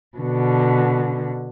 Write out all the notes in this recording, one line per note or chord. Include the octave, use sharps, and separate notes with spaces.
B2 D3